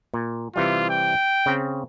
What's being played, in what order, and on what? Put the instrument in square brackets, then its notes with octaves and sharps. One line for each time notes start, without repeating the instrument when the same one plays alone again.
[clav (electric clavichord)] A#2
[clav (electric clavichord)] C3 E3 G3 [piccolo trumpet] F4
[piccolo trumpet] G5
[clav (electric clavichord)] C#3 C4